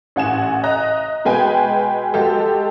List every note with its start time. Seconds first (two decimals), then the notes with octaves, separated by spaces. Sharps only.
0.16 A1 F#5 G#5 E7
0.64 D#5 A#5 F#6
1.25 B2 G#3 B4 G5 G#5
2.14 G#3 F#4 G4 A4